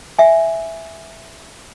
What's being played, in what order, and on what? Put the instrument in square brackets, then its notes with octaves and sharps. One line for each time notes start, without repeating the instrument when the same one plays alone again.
[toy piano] E5 G#5